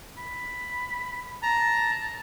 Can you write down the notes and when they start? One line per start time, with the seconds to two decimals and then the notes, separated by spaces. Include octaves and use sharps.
0.17 B5
1.43 A5 A#5